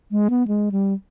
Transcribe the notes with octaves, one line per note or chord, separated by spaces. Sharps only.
G#3
B3
G#3
G3